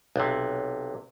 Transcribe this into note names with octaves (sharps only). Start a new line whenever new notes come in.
B1 C3